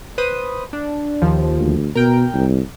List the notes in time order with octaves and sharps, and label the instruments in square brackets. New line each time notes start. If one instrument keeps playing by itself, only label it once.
[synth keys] B4 C5 D#6
D4
D#2 F3
[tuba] D2
[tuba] B2 [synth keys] A#4 G5
[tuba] C2